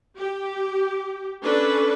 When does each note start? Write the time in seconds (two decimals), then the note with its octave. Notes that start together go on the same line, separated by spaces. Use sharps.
0.18 G4
1.44 C#4 D4 A4 B4